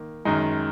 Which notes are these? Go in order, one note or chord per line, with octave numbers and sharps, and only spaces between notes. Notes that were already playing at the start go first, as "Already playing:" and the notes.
Already playing: D#3 A#3 D#4
F#2 D#3 G#3 D#4